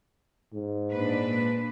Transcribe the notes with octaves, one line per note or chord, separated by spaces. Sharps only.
G#2
A#2 D4 B4